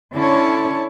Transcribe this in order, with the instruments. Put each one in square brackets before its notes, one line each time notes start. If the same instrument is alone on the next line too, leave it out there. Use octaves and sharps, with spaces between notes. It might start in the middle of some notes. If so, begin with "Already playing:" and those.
[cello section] D3 C#4 C#5 [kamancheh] E4 A5